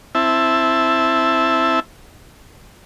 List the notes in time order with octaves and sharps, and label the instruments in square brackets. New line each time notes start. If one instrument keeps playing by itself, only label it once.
[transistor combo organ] C4 E4 E5 A5